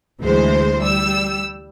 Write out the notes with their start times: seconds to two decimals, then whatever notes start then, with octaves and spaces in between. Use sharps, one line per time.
0.21 D2 E3 G#3 C5
0.80 G3 E6